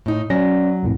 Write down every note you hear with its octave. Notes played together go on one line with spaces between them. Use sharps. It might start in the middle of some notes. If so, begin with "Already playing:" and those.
A2 D#4
F#3 C#4 D5 A#6
C2 F2 A2